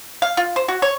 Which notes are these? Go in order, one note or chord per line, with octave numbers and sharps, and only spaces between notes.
F5
F4
C5
F#4
C#5